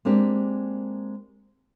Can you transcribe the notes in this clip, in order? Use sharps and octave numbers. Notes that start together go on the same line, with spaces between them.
G#3 A#3 C4 D4 G4